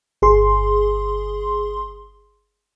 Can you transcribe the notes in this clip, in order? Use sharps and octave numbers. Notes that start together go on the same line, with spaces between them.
G1 G#4 C6